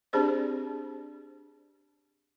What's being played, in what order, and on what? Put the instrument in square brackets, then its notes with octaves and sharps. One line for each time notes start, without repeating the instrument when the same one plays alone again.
[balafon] C4 D4 G4 G#4 C5 D5